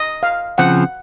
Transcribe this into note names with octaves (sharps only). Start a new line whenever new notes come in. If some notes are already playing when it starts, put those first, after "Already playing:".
Already playing: D#5
F5
C#3 F3 C4 F#5